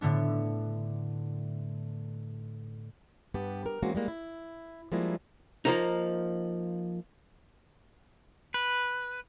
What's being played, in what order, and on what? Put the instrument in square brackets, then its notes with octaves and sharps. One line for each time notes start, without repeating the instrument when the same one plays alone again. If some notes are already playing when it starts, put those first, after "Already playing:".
[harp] A2 D3 B3 D4
[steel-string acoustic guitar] G2 B3 G4 A5
A#4
E3 G#3 A#3 C4 C#4 F#4
G3 G#3 A#3
E4
F3 G3 G#3 A#3 D#4 E4
[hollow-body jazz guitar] F3 A#3 D#4
[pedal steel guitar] B4